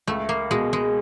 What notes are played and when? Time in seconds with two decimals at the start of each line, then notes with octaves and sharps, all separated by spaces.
0.07 C#2 A3
0.29 A#3
0.51 B2 G#3
0.73 G#3